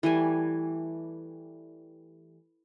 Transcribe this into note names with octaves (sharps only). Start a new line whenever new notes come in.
E3 G3 A3 G#5